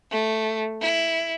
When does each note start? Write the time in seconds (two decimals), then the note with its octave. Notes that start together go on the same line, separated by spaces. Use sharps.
0.11 A3
0.81 E4